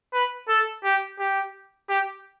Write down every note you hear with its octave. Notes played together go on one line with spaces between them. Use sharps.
B4
A4
G4
G4
G4